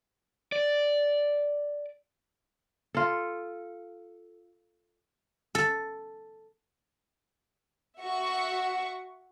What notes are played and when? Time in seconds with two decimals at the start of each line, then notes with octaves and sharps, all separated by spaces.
0.52 D5
2.95 F4 A4
5.55 A4
8.00 F#4 E5 F#5 C#6